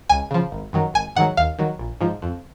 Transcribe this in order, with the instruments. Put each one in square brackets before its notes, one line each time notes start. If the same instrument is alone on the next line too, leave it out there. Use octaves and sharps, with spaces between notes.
[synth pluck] C#2 G#5
C#3 F3
G#1
F#2 D#3 F#3
G#1 G#5
G#2 D#3 F#3 F#5
D#2 F5
D#3 F#3
A#1
G#2 F3
F2